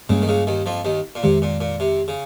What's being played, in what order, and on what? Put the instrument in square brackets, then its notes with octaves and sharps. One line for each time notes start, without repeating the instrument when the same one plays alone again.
[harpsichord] C#2 C#3 [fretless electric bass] G2 G3 A#3 C#4
[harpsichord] D#3
C#2 C#3
D#2 D#3
F2 F3
D#2 D#3
A#2
[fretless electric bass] F2 D#3 G#3 [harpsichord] C3
[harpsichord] A#2
A#2
C3
C#3